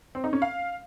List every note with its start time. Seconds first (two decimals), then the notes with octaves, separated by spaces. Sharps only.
0.15 C4
0.24 D#4
0.33 C#4
0.42 F5